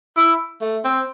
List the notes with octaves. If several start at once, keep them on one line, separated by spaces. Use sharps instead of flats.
E4
A3
C4